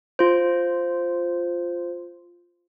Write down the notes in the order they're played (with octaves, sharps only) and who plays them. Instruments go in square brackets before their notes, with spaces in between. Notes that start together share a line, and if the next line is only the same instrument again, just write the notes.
[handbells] F4 C5